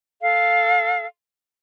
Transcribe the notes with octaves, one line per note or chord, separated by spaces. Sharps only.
A4 F5